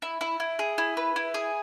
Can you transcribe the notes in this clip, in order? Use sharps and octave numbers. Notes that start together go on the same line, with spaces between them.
E4
E4
E4
G#4
E4
B4
E4
G#4